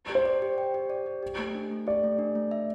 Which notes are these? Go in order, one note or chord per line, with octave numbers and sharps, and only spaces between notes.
G4
C5
D5
G4
G5
G4
D5
G4
G4
A3
D4
A3
G4 D5
A3
D4
A3
E5